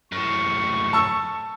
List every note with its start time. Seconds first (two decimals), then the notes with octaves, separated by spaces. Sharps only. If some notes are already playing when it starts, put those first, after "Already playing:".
0.12 F#2 A2 C#6
0.93 A5 E6